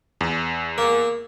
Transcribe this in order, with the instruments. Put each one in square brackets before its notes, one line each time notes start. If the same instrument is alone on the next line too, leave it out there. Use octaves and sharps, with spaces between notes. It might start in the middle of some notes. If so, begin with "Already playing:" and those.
[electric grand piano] E2
[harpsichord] A#3